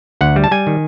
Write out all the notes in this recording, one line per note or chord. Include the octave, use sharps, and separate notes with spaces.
D2 F#5
G3
A5
G3 G#5
D#3